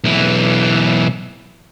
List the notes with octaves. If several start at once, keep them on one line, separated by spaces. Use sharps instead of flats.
B1 E3